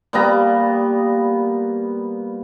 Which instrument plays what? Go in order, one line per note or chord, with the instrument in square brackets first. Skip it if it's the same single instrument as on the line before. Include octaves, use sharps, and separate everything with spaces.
[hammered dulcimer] A#2 G3 B3 A#5